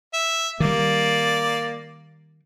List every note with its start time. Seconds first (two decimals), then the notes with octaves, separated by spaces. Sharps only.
0.13 E5
0.60 D#3 G3 A#3 D5